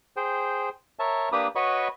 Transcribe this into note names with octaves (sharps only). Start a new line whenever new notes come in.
G#4 C5 G5
A#4 C#5 E5 A5
A#3 D4 G4 B4 B5 D#6
F#4 B4 C#5 D#5 B5 C#6